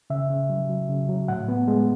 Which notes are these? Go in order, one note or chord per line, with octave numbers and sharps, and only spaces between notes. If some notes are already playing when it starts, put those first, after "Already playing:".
C#3 E5
C#3
F#3
F#3
C#3
F#3
A2 F#5
B3
G#3